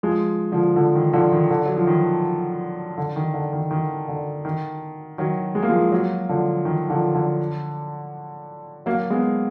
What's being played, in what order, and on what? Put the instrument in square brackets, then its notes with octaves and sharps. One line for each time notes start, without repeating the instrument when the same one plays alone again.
[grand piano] F3 G#3
D3 F3
D3 F3
D#3
D3 F3
D#3
D3
F#3
F3
D#3
D3
D#3
D3
D#3
D#3
D3
D#3
D#3 F#3
G#3
A#3
F3 G#3
F#3 A#3
D3 F3
D#3
D3 F3
D3
F#3 A#3
G#3 B3